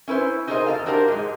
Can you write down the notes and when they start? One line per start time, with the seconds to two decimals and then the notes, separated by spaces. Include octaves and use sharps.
0.08 C#4 E4 B4 C5
0.47 D#4 F#4 G#4 A#4 C5 D#5
0.67 E2 A4 F5
0.86 D4 F#4 G4 A#4 C5
1.08 G#2 G#3